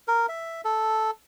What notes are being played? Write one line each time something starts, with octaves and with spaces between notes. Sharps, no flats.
A#4
E5
A4